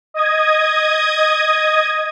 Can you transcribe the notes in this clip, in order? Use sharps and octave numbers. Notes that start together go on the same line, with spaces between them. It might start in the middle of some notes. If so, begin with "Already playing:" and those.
D#5 D#6 G#6